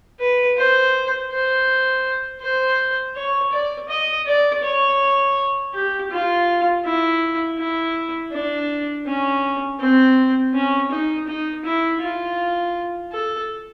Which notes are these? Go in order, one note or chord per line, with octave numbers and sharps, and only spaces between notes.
B4
C5
C5
C5
C#5
D5
D#5
D5
C#5
G4
F4
E4
E4
D4
C#4
C4
C#4
D#4
D#4
E4
F4
A4